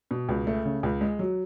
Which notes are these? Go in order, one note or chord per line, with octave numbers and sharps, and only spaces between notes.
B2
C#2
A3
C#3
C#2
G#3
F#3